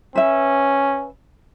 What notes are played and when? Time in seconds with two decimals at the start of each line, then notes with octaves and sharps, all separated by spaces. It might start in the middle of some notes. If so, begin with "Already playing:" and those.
0.15 C#4 B4 E5